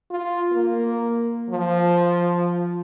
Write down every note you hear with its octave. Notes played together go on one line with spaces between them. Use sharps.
F4
A#3
F3